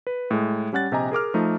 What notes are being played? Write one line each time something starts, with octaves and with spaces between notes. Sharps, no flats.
B4
A2 G#3
G3 C#4 F#5 F#6 A6
A#1 C3 G4 D#5 G#5 A#5
G#4 A#4 D6 F6
F3 A3 D#4